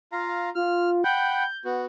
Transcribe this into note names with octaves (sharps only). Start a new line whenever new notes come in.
F4 F5 A#5
F4 F6
F#5 G5 B5 G6
B3 F#4